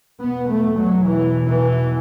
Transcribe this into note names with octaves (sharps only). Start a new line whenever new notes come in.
E2 B2 B3
A3
F#3
E3
E3